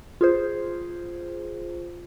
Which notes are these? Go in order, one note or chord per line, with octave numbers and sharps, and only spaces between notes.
F4 G#4 C5